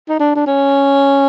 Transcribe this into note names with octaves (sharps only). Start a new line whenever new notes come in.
D#4
D4
D4
C#4